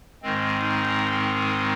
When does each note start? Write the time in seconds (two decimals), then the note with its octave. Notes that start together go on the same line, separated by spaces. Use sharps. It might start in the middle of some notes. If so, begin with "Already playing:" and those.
0.22 G#2 D#3 G#3 C4
0.59 D#4